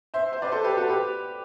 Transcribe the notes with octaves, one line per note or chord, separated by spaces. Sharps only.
C5 E5
C5 E5
B4 D5
A4 C5
G4 B4
F#4 A4
G4 B4